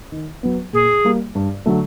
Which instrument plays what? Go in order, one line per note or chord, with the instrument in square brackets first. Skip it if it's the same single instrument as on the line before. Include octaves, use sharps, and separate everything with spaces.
[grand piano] D#3
F#3 B3
[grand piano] A#2 [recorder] G#4
[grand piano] G3 A#3
G2
D3 F#3 A3